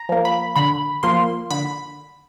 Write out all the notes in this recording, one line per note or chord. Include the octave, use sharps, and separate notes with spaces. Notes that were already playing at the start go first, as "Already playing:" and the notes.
Already playing: A#5
F3 A#3
B5
D3 B5
F3 A#3 C6
D3 B5